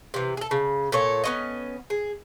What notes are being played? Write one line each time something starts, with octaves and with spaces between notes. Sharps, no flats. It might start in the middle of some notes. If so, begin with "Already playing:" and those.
C3 E3
G#4 A4
C#3
A#2 A4 C#5
B3 C#4 D#5
G#4